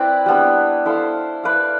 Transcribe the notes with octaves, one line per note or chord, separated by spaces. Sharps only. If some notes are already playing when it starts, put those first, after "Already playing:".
Already playing: C4 E4 B4 D5
G3 B3 D4
E4 A4 C5 F5
E4 B4 D5 F5